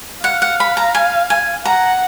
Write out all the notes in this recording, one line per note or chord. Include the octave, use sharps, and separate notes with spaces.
F5 F#5
F#5
B5
A#5
G#5
G#5
F#5 A#5